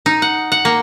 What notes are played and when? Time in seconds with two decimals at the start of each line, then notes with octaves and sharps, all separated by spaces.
0.06 D#4
0.22 F#5
0.52 F#5
0.65 A#3